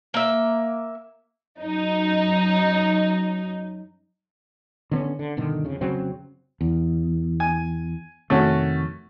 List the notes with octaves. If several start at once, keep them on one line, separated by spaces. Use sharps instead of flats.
A#3 E5
F#2 D#4
D3 B3 C#4
D3
G1 B2 D3 D#3
F2 C#3
F1 C#3 F#3 C4
E2
G#5
F2 C3 D#3 A3 C#4 F#4